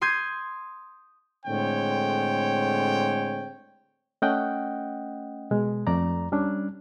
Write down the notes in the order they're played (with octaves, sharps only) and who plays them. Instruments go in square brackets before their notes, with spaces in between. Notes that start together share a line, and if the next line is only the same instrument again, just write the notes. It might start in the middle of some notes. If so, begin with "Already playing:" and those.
[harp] C6 D#6 G6 G#6
[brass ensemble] A2 D3 G#3 C4 C#5 G5
[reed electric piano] A3 C#4 D#5 F#5 G5
B2 G#3
F2 A3 D5 A#5
G3 C#4 D4